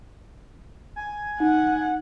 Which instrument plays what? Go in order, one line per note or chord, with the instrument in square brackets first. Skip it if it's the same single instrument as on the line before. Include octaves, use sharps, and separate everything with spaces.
[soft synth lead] G#5
[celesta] D#4 [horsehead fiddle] F#5